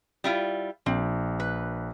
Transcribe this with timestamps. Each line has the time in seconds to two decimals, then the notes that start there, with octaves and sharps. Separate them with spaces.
0.24 G3 E4 F4
0.86 A#1 C4
1.40 B4